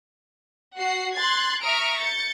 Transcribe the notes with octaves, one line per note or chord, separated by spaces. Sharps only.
F#4 F#5 C7
C6 F#6 G#6 A6 C7
E5 A#5 C#6 D#6 F6 D7
G6 A6 C#7